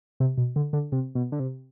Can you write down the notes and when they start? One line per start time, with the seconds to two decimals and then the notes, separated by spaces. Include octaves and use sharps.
0.20 C3
0.38 B2
0.56 D3
0.73 D3
0.92 C3
1.15 B2
1.32 D3
1.40 C3